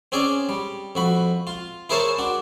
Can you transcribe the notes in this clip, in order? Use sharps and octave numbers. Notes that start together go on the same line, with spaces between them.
C4 C#4 G#4 D5
G3
F2 F#4 B5
F4
E4 G#4 A#4 C5 C#5 A5
D4 F#4